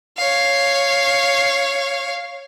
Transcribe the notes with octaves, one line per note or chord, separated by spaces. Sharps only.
C#5 F5